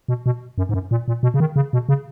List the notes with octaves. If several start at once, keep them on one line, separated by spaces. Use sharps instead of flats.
B2
B2
F#2
G#2
F#2
A#2
A#2
B2
C#3
D#3
C#3
B2
C#3